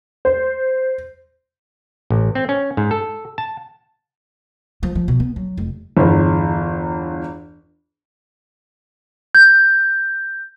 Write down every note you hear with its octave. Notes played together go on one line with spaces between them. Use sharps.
C5
A1
C4
C#4
G#2
A4
A5
F3
F3
B2
B3
F#3
F1
G1 E2
G6